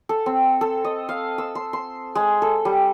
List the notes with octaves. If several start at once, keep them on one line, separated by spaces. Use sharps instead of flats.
A4
C4
A4
D#5
F5
E6
C6
C6
G#3
A4
G3